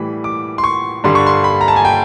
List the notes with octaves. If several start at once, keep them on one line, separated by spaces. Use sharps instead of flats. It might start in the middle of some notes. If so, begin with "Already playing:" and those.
Already playing: A2 E3 G3 B5
D6
C6
C#6
G2 D3 G3 C6
C#6
C6
B5
A#5
A5
G#5
G5